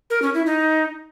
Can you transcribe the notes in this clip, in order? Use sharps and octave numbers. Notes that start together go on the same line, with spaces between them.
A#4
C#4
E4
D#4